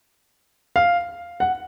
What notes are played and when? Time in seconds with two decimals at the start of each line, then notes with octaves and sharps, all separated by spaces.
0.76 F5
1.40 F#5